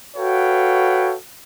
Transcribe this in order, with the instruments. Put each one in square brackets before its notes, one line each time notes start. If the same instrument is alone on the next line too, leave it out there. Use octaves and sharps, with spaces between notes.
[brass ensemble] F#4 A4 B4 C#5 F5 G5